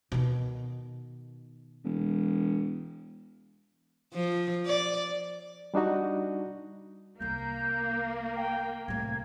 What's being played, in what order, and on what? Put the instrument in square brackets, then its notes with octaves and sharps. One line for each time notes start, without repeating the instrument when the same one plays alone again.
[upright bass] B2 D#3
[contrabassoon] E1
[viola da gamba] F3
D5
[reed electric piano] G3 D4 D#4 F#4
[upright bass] C2 D#3 [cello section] A#3 [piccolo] G6
[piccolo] G5
[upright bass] C2 A2 [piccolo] G#6